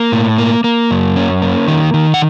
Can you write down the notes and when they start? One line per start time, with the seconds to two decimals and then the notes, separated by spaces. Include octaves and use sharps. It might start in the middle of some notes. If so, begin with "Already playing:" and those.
Already playing: A#3
0.12 A2
0.38 A#3
0.64 A#3
0.91 F#2
1.16 C#4
1.42 A#3
1.68 D#3
1.94 D#3
2.14 F#5